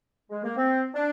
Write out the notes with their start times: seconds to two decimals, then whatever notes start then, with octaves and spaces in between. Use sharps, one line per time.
0.30 G#3
0.43 A#3
0.56 C4
0.94 D4